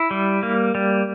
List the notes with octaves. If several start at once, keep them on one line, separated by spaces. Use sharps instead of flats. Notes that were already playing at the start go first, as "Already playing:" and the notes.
Already playing: E4
G3
A#3
G3